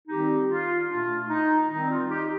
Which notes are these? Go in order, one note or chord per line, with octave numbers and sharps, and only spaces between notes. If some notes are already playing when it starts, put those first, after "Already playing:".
D#3 G3 C4 D#4 G4
F4
A#2 A3 D4 F4
D#4
D#3 G3 C4 D#4
F4
D#4 G4